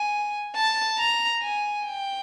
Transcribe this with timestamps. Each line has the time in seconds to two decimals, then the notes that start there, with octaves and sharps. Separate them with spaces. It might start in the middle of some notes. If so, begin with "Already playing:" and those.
Already playing: G#5
0.56 A5
0.99 A#5
1.42 G#5
1.85 G5